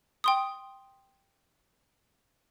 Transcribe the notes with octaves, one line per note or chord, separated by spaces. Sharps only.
G5 C6 D#6